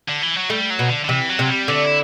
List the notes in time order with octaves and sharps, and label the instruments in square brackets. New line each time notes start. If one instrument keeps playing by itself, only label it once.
[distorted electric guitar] D3
E3
F#3
[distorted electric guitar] G3 [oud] A3
[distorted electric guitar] F#3
[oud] B2
[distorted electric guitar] D3
D3
[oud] C3 [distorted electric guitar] E3
[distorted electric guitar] F#3
[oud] C3
[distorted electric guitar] G3
[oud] D3 [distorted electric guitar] A3
[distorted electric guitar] E4